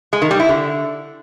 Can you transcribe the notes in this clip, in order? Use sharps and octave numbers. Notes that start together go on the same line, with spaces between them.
G#3
D#3
G3
E4
D3